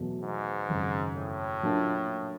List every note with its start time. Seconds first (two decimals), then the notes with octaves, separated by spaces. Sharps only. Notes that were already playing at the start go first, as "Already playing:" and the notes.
Already playing: E2 B2 F#3 A3
0.22 G#2
0.68 G#1 F#2 C#3
1.16 A2
1.62 A#2 F#3 A#3 D4 F4